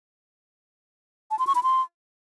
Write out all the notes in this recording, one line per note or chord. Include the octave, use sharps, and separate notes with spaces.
A5
C6
C#6
B5
C6